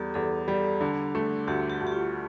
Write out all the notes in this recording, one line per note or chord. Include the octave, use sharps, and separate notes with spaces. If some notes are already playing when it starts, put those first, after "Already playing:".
Already playing: E2 G3 G4 A4
E2 A4
G3
D3
A3
D2 G4
G4
D2
G4
F4